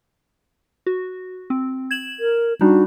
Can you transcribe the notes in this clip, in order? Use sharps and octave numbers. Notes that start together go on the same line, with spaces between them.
F#4
C4
G#6 E7 F#7
A#4
G3 D4 D#4 F#4